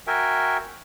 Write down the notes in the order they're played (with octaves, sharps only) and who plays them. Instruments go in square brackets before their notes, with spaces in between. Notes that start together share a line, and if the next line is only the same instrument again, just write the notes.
[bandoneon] F#4 A#4 E5 G5 G#5